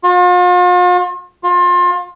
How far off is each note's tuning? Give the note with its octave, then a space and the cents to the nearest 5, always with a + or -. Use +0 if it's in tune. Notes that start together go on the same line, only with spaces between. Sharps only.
F4 +45
F4 +30